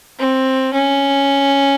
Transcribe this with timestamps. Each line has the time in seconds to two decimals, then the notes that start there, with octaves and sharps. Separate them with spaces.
0.19 C4
0.73 C#4